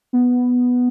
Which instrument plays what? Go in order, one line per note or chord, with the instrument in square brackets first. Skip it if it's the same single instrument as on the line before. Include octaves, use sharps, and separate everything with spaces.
[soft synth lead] B3